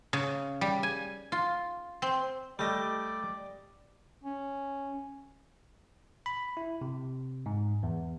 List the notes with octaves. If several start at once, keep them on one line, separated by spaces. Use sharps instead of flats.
C#3
G3
G#5
F4
C4
G3 A3 G4 D5 D#5
C#4
B5
E4
C3
G#2
E2